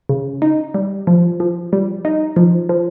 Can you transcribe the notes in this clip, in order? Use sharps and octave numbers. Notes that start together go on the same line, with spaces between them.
C#3
D#4
G3
F3
F3
G3
D#4
F3
F3